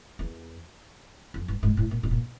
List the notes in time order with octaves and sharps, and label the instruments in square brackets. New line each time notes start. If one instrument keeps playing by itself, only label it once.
[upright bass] E2
F2
G2
G#2
A2
A#2
B2
A#2